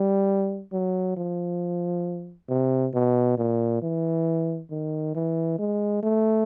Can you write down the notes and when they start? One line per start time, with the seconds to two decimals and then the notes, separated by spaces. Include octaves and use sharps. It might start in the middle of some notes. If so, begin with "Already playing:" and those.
Already playing: G3
0.73 F#3
1.17 F3
2.49 C3
2.94 B2
3.38 A#2
3.82 E3
4.71 D#3
5.15 E3
5.59 G#3
6.03 A3